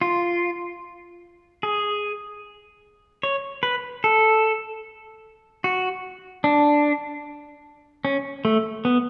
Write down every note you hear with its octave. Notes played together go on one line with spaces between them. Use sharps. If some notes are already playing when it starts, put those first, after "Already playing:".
F4
G#4
C#5
B4
A4
F#4
D4
C#4
A3
B3